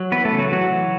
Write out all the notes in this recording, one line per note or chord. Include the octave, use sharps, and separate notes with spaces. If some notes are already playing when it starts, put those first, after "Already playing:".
Already playing: F#3
E3 B3 B4
A3 A4
C#3
F#3 F#4
E3 F#3 F#4
E3